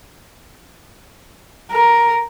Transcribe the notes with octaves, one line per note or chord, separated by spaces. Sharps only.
A#4